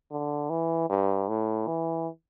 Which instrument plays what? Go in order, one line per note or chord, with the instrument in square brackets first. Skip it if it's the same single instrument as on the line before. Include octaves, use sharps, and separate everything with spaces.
[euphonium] D3
E3
G2
A2
E3